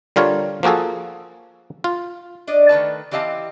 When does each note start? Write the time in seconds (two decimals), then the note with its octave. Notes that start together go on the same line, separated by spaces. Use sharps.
0.16 D3 G3 F4 A#4 C#5
0.63 F3 A#3 F#4 G#4 A4
1.84 F4
2.47 D4 D5 D#5
2.69 D#3 A3 B4 A5
3.11 E3 C4 G4 D#5 F5 A5